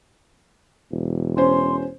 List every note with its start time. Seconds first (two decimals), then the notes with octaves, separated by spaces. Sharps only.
0.91 E1
1.37 C#4 C5 C6